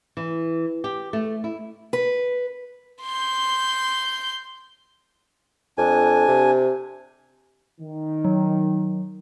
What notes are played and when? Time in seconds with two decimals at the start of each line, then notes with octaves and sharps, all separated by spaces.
0.17 E3
0.84 G4
1.13 A3
1.44 E4
1.93 B4
3.03 C6 G6
5.78 F2 D4 G#5
6.27 C3
7.81 D#3
8.25 F#3